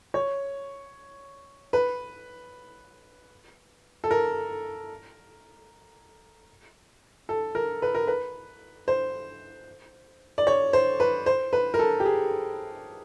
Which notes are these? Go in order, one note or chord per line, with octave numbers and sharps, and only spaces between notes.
C#5
B4
A4
A#4
A4
A#4
B4
A#4
B4
C5
D5
C#5
C5
B4
C5
B4
A#4
A4
G4
G#4